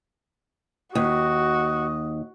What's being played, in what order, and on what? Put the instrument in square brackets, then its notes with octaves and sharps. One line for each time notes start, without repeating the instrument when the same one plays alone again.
[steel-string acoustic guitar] D#2 [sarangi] F#4 [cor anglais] D#5